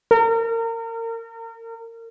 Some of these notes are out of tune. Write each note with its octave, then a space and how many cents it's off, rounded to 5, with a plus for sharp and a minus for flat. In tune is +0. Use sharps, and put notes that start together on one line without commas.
A#4 -35